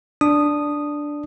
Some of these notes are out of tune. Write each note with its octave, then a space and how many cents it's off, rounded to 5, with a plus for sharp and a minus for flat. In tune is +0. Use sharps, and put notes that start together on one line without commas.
D4 +0 D#6 -10